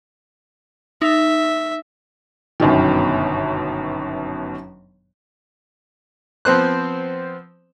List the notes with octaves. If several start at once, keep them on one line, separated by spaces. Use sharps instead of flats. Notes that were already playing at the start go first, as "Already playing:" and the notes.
D#4 E5
G1 F#2 B2 D#3
F3 B3 C4 C5 F#6